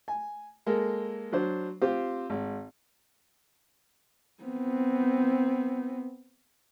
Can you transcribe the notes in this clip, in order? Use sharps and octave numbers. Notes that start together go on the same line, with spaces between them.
G#5
G#3 A#3 A4 A#4
F#3 D4 C5
C4 F4 G4 C5
G#1
B3 C4